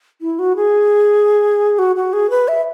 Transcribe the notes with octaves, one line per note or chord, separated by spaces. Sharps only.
E4
F#4
G#4
F#4
F#4
G#4
B4
E5